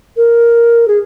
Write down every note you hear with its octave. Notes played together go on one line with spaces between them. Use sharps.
A#4
G#4